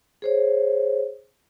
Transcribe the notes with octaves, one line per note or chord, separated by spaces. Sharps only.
G#4 C5 C#5